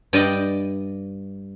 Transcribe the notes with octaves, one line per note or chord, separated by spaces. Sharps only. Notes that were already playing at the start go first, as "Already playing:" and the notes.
G2 D5 D#5 G5 B5